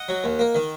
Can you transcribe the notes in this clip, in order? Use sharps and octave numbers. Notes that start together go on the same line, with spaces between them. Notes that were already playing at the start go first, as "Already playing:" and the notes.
Already playing: D#5 F#5
F#3
D#2
A#3
D#3